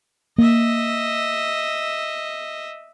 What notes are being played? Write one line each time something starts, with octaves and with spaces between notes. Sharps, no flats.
A#3 D#5 E5